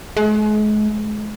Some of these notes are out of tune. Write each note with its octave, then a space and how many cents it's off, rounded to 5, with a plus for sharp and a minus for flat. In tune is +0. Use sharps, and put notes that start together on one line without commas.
G#3 +40